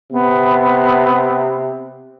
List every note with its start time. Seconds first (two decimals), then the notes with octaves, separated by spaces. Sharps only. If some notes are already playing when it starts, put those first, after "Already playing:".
0.12 C3 B3